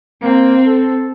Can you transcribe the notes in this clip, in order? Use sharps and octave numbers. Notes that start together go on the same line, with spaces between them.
A#3 C4
A4